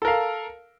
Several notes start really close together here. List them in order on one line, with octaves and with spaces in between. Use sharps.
A4 A#4 F5